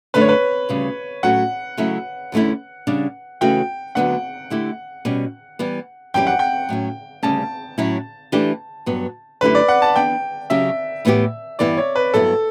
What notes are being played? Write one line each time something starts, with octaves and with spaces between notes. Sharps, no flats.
F#2 D3 A3 D4 B4
C#5
B4
D2 C#3 G3
A2 F#3 A3 C#4 F#4 F#5
C#3 F#3 A3 C#4 E4
E2 D3 A3 C#4 E4
C#3 G3 D4
C#3 E3 A3 C#4 F#4 G5
D2 D3 F#3 B3 D4 F#5
D3 A3 E4 G4
B2 G3 C#4
E3 G3 B3
F#2 E3 G3 C#4 G4 G5
F#5
G5
A2 F#3 C#4
D2 C#3 G3 C#4 A5
A2 F#3 C#4 E4
E3 A3 D4 G4
G2 F#3 B3
F#2 D3 A3 E4 G4 B4
D5
F#5
A5
E3 B3 D4 G5
C#3 F#3 C#4 G4 E5
A2 E3 B3 E4 G4
G2 E3 B3 E4 D5
C#5
B4
G2 F#3 B3 E4 A4